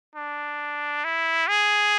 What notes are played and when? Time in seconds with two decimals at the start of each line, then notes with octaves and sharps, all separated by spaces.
0.15 D4
1.04 E4
1.48 G#4